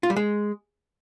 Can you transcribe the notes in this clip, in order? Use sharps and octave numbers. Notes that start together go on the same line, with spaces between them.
F4
G3
G#3